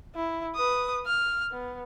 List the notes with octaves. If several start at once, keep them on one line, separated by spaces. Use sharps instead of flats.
E4
B4 D#6
F6
B3